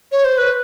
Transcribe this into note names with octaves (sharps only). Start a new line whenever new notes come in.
C#5
C5
B4